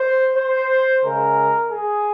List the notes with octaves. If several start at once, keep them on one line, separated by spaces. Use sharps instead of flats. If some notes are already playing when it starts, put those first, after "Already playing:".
Already playing: C5
C5
C#3 G#3 A#4
G#4